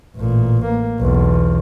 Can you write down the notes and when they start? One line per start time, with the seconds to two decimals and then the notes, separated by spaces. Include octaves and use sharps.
0.17 A1 A#2
0.66 A#3
1.00 B1 E2